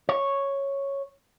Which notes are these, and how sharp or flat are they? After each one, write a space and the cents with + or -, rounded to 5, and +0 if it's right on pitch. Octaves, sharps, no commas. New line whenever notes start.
C#5 -5